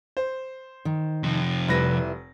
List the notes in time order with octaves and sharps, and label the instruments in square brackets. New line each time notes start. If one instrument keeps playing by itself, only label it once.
[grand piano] C5
[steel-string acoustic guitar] D#3
[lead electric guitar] F2 C3
[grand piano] F1 B4 A#6 [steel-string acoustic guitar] G3 E4 E5